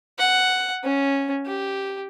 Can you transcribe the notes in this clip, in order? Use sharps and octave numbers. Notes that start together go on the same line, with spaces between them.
F#5
C#4
G4